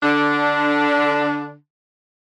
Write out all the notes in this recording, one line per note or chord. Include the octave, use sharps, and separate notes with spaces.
D3 D4